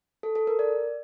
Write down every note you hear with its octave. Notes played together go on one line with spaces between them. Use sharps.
A4
A4
A#4
D5